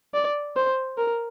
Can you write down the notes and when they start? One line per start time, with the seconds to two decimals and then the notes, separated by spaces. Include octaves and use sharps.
0.14 D5
0.56 C5
0.98 A#4